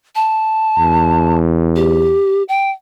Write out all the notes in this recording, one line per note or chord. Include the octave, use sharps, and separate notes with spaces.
A5
E2
G4
G5